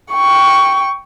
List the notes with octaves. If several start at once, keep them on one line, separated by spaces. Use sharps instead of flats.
G5 C#6